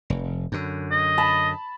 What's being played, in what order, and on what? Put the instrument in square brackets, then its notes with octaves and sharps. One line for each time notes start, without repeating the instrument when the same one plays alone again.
[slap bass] F1
F#2 D3
[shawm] D#5
[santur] A5 B5